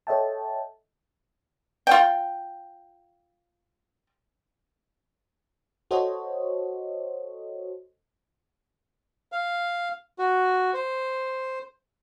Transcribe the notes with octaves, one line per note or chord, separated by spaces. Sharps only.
A4 C#5 D#5 E5 G5 A5
F4 G5
F#4 A4 C5 C#5 D#5
F5
F#4
C5